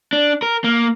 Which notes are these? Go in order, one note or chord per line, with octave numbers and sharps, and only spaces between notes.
D4
A#4
A#3